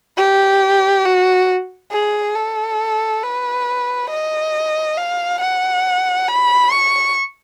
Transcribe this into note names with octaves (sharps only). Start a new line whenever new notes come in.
G4
F#4
G#4
A4
B4
D#5
F5
F#5
B5
C#6